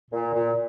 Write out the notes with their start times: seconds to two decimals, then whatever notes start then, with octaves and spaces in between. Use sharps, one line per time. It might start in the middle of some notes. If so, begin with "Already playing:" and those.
0.11 A#2
0.34 A#2